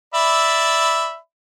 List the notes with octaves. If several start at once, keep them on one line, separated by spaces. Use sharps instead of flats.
D5 E5 B5